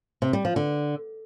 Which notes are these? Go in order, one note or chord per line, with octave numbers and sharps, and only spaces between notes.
C3
G3
F3
D3